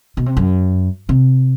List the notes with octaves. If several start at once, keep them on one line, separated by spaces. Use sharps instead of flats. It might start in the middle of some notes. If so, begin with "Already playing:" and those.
B2
C3
F#2
C3